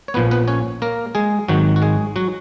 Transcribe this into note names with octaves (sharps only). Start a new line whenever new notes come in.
C#5
A#1 A#2 F3 B3 B4
B3 B4
C#4 C#5
A#3 A#4
G#3 G#4
G#1 G#2 D#3 F#3 F#4
F#4
G#3 G#4
F#3 F#4